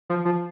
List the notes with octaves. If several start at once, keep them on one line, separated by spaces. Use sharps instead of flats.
F3
F3